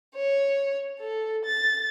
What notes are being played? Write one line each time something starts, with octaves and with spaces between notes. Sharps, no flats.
C#5
A4
A6